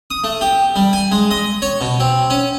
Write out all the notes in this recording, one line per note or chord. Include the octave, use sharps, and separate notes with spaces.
D#6
A3
G4
G3
G#5
G#3
D#5
C#5
B2
C4
C#4